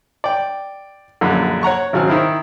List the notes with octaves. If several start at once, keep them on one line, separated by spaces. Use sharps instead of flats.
D5 G5
A#1 F#2 D3
C#5 F#5 A#5 C#6
G#1 C#3 F#3 C5 F6
D#3 E4 C5